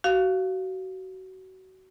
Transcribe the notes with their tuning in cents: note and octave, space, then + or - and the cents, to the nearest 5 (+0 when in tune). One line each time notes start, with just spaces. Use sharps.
F#4 +25 F5 +0